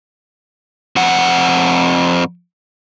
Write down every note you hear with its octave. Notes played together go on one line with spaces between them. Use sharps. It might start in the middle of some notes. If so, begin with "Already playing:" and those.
F2 F#5